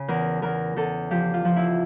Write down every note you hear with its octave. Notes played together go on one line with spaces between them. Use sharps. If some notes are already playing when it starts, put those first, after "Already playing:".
Already playing: C#3
E2 A#4
E2 A#4
E2 A4
F3 G4
F4
F3
E4